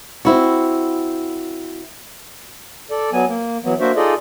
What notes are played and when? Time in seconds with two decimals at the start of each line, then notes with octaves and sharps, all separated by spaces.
0.25 C4 E4 F#4
2.90 A4 D5
3.13 F#3 B3 G#5
3.28 A#3
3.64 E3 F#3 B3
3.80 A#3 D4 F#4 C5 E5
3.96 D#4 F4 G#4 A4 D5 D#5